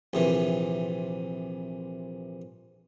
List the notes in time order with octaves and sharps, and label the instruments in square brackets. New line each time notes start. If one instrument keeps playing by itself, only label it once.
[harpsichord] A#1 C3 E3